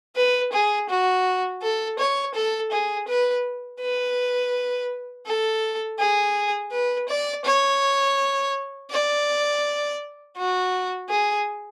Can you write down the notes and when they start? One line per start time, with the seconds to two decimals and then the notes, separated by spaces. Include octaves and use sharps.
0.16 B4
0.53 G#4
0.89 F#4
1.62 A4
1.99 C#5
2.35 A4
2.71 G#4
3.08 B4
3.80 B4
5.26 A4
5.99 G#4
6.72 B4
7.08 D5
7.45 C#5
8.90 D5
10.37 F#4
11.09 G#4